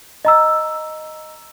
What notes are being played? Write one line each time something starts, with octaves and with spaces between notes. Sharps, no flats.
D#5 A#5 E6